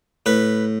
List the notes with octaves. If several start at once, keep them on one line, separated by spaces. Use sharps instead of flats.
A2 B4